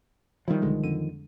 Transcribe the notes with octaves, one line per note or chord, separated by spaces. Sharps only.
D#3 F3 G3 E4
B1 D3 G#3
F2 D3 D#7